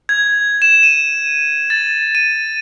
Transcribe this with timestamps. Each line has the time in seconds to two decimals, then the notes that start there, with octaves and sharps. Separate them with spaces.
0.09 G#6
0.62 E7
0.83 D#7
1.70 A6
2.15 D#7